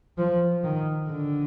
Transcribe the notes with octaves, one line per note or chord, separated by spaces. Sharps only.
F3
D#3
D3